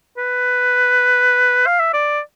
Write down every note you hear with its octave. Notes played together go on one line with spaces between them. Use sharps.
B4
F5
E5
D5